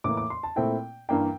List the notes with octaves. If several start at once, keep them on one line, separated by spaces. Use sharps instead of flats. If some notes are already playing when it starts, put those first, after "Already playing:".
A2 E3 A#3 D6
D6
C6
A5
A#2 A3 C4 E4 G5
G2 E3 A#3 D4 G5